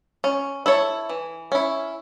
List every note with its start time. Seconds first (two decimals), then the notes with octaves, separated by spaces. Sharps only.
0.24 C#4
0.66 E4 A4 C#5
1.09 E3
1.52 C#4 E4